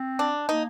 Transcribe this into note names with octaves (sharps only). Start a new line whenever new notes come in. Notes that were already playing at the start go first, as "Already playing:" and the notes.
Already playing: C4
D4
A#3 D#4